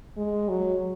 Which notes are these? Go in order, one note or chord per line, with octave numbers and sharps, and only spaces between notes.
G#3
F#3